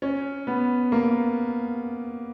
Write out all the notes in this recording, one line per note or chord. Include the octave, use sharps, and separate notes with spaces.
C#4
B3
A#3